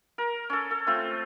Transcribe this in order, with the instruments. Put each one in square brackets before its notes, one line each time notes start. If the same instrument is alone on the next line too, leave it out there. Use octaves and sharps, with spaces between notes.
[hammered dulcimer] A#4
C#4 A4
A4
A3 C4 F4